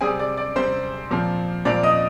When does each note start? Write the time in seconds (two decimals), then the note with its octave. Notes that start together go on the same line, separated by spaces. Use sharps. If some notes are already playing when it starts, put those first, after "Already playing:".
0.01 C3 G3 C4 G#4 G#5
0.19 D5 D6
0.37 D5 D6
0.56 C3 G3 C4 C5 C6
1.10 A#2 F3 C4
1.65 A#2 F3 C4 D5 D6
1.83 D#5 D#6